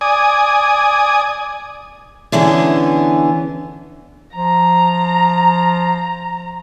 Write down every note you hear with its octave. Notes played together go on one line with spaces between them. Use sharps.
D5 G#5 D#6
D3 E3 B3 C#4 G#4
F3 A#5